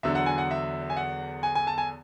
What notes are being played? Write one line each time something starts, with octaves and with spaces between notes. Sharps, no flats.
E2 D3 F#3 E5
F#5
G#5
F#5
E5
G#5
F#5
G#5
G#5
A5
G#5